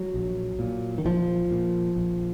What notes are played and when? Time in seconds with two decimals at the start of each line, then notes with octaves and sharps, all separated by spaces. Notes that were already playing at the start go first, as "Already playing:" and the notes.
Already playing: F#3
0.14 A#1
0.59 A#2
0.98 D#3
1.05 A#1 F3
1.51 A#2
1.96 A#1